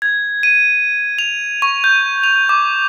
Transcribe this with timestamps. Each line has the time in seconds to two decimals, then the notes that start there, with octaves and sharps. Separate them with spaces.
0.02 G#6
0.43 D#7
1.19 F7
1.62 C#6
1.84 G6
2.24 F7
2.49 D6